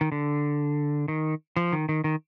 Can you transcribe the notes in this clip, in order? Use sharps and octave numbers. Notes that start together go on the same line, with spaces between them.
D#3
D3
D#3
F3
D#3
D#3
D#3